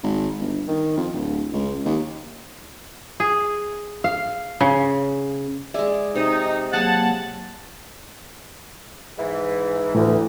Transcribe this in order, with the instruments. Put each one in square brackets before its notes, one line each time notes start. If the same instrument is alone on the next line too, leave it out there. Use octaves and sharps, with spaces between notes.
[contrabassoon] G#1
G1
D#3
F2
D1
C#2
D#2
[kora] G#4
F5
C#3
[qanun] G#3 G#4 [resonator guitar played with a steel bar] D5 E5
[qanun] C3 [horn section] D#4
[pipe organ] F#3 A#3 [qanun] G#4 G#5 [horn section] F#5 A5
[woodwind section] G#2 E3
[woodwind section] D2 [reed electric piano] A2 [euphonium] E3